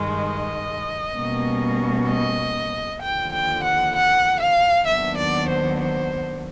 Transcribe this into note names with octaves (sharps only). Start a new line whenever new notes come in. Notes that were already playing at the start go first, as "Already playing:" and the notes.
Already playing: G2 D#3 G#3
D#5
B2 G3 A#3 C#4
D#5
D#2 D3 F3 G5
G5
F#5
F#5
F5
D#2 D#3 F#3 B3 D4 E5
D5
C5
C5